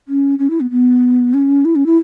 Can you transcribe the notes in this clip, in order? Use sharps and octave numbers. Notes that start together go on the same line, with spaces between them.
C#4
C#4
E4
B3
B3
C#4
E4
C#4
E4